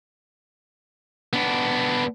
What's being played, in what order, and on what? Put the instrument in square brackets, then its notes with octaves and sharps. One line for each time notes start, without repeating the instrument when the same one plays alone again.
[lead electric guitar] B3 D4